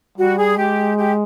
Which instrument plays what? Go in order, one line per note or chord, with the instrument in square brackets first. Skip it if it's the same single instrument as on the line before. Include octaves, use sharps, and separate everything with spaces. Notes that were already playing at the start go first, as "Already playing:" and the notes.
[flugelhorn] G3 [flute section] F#4
[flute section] G#4
[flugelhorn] G#3 [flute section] G4
[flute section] G4